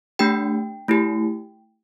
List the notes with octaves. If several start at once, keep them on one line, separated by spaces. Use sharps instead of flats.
A3 D4 G4 G5
A3 E4 G4